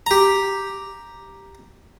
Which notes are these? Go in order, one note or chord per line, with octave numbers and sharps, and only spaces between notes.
G4 A#5